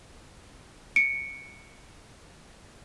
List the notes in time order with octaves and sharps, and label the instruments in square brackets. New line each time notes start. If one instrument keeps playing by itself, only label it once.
[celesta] C#7 D7